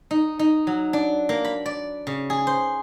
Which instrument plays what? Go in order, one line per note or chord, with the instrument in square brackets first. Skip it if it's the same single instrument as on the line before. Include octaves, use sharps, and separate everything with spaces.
[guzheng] D#4
D#4
F#3
D4
A#3
B5
D5
C#3
G#4
C5